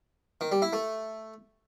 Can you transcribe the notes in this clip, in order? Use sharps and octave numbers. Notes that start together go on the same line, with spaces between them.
D#3
G3
E4
A3